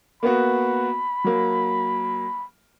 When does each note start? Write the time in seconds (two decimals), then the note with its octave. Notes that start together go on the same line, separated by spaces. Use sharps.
0.23 A#3 B3 F#4 B5
1.24 F#3 A#3